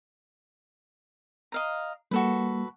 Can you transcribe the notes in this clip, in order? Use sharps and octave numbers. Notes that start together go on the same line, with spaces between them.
D#5 F5 A#5
G3 A#3 F#4 A4 B4